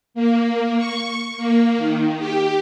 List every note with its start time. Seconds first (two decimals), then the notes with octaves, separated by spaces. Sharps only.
0.14 A#3
0.77 C#6
1.37 A#3
1.78 D#3
2.18 G4